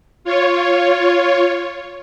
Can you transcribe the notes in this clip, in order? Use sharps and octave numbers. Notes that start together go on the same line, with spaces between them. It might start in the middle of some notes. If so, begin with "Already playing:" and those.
F4 C#5